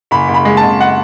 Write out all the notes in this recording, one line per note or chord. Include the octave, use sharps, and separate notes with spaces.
F#1 B5
F#1
B5
G#3
A5
F#1
F#5